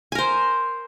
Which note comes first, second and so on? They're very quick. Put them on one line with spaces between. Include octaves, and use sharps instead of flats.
G#5 A#4 C5